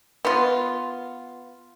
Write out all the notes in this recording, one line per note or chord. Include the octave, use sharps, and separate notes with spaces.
B3 F4